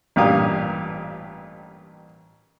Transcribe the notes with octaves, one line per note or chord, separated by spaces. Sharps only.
A1 G2 A#2 G4 F5 D#6